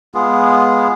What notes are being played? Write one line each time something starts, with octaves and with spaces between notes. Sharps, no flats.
G#3 B3 F4 G#4